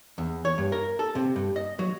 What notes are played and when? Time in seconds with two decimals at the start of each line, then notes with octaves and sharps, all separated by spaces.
0.18 E2
0.45 C#5
0.58 G2
0.72 A#4
0.99 A4
1.15 C3
1.36 G2
1.56 D#5
1.79 F#3